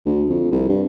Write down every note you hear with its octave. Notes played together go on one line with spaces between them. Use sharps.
D2
F2
C2
G2